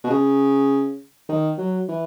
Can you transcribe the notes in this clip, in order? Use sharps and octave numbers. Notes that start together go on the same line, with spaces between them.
B2
C#3
D#3
F#3
E3